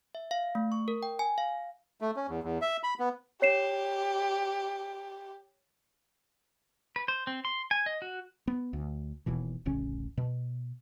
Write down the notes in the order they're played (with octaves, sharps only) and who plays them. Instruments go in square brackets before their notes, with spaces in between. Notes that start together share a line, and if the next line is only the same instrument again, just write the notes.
[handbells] E5
F5
A3
C#6
A#4
G5
G#5
F5
[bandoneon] A3
C#4
E2
E2
E5
B5
B3
[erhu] G4 [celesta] C#5 C7 E7
[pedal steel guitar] B4
C5
C4
C6
G#5
D#5
F#4
[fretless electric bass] B3
D2
D#1 D#2 B2 E3
D1 A1 C#3 C#4
B2